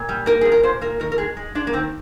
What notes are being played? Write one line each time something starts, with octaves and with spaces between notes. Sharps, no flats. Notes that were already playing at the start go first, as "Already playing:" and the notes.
Already playing: A#2
G3
A#3 A#4
A#2 G#4
A#4
A#2 C5
A#3 A#4
D#3 A#4
A#4
G#3 G#4
G#3
G#3 D4
A#3
D#3 C4